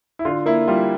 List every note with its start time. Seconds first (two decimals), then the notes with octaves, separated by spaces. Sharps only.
0.19 E4
0.25 D3 F4
0.46 A#3 E4
0.68 G3 F4